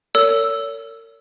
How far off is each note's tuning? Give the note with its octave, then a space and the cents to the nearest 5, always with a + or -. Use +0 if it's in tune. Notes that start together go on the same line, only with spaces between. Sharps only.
A#4 -45 C#5 +35 E6 +0